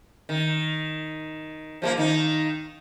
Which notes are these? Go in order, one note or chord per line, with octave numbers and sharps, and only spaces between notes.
D#3
F3 G#3 A#3
D#3 D#4